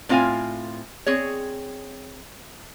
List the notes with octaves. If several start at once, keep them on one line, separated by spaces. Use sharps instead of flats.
A2 C4 F4 F5 G#5
C4 G#4 C#5